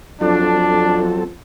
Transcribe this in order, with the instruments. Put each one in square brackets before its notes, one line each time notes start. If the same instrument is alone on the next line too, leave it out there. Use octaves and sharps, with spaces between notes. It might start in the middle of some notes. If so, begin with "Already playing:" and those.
[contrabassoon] F2 [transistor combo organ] F#3 C4 A4 [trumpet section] D4